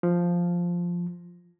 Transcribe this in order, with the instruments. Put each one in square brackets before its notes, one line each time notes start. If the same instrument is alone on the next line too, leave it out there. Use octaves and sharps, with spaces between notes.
[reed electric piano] F3